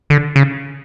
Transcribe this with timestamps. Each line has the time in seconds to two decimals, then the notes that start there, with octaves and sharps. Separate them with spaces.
0.10 D3
0.36 C#3